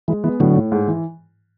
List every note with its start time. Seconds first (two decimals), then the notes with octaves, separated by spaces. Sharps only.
0.08 E3 G#3
0.24 E3 B3
0.40 A2 D3 F#3
0.56 A2
0.72 G#2
0.88 E3